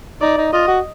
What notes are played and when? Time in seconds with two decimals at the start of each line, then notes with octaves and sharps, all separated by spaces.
0.21 D#4 D5
0.37 D#4
0.53 F4 D#5
0.68 F#4